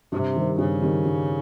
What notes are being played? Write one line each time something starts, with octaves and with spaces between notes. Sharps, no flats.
G2 C3
D#3 G3 C4
G2 C#3
D#3 G3 C4
G2